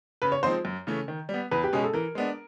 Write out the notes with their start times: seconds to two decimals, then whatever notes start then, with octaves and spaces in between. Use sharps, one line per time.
0.22 C#3 B4
0.32 C#5
0.43 F3 G#3 C4 D#4 C5
0.65 F#2
0.87 C#3 E3 A3 C#4
1.08 D#3
1.29 G3
1.34 B3
1.51 E2 B4
1.64 G4
1.73 B2 G#3 C#4 G#4
1.84 A4
1.94 E3 A#4
2.15 G#3 B3 D4